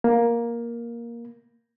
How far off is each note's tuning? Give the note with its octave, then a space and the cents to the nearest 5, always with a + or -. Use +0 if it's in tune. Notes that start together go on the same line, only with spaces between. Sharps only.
A#3 +10